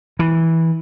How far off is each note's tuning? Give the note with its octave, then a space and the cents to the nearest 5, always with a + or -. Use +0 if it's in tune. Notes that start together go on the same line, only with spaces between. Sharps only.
E3 -10